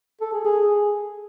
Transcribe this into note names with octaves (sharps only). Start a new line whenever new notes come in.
A4
G#4
G#4